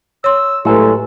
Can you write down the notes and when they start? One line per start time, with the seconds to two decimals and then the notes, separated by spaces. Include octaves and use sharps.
0.24 C#5 C6 E6
0.65 A2 F#3 G#3 E4 G4 A4 B4